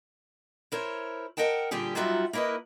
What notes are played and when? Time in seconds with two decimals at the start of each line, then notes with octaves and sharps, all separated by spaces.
0.72 E4 A#4 C5 C#5
1.37 A#4 D#5 F#5 G5 A5
1.71 A#2 D3 G3 G4 G#4
1.95 F#3 G3 D#4 F4 F#4 E5
2.33 A#3 E4 A#4 B4 D#5